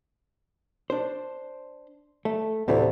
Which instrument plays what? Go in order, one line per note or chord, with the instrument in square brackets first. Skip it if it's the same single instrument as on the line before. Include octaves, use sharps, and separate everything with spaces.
[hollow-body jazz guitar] D4 C5
A3
[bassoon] D2 [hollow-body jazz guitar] A2 C3 E3